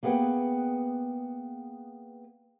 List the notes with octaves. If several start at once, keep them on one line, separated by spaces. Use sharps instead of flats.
A#3 B3 G#4 B4 F#5 G5